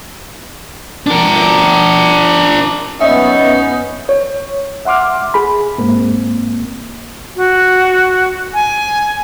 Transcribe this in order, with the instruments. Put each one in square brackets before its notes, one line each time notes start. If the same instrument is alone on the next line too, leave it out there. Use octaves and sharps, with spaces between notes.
[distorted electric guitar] D4 A#4
[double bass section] F#2 B3 [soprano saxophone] C#4 [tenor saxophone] D#4 [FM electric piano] D#5 E5
[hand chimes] C#5
[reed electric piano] E5 F#5 C6 D6 F6
G#4 B5
G#2 A#3 C4
[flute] F#4
G#5